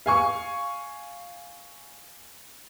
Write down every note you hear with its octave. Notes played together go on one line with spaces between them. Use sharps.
F5 G#5 C#6